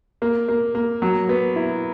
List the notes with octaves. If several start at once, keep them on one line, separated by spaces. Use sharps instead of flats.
A#3
A#3
A#3
F#3
B3
E4